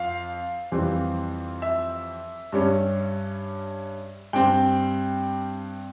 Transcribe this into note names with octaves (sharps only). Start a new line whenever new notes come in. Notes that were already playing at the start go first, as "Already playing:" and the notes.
Already playing: F2 F5
F2 E3 G3 C4
E5
G2 G3 C#4
G2 G3 C4 G5